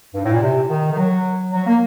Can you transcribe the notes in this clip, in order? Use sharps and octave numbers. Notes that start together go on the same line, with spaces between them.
G2
A2
A#2
C3
D#3
D#3
F#3
F#3
A#3